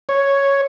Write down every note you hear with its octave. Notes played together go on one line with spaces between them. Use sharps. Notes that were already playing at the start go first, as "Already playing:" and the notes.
C#5